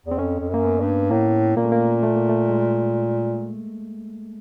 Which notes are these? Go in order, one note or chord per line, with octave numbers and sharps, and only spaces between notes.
E2
C4
F2 C#4
F2
F#2 A#3
B3
G2
A2 A#3
A#2 A#3
A3
A#3
A3
A#3
A3
G#3